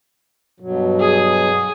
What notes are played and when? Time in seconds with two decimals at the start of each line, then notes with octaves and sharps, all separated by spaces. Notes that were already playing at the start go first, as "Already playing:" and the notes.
0.60 G2 B2 F#3
0.99 G#4